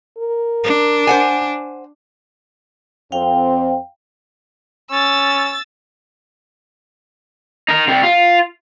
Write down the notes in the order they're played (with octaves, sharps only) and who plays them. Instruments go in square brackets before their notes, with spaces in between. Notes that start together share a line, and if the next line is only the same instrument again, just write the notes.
[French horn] A#4
[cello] D4
[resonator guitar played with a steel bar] C5 F#5 G#5
[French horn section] F2 C4 C5 [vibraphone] F5 G5
[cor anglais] C#4 [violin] E6 A6
[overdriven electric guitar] D#4 A#4
C3 G3
F4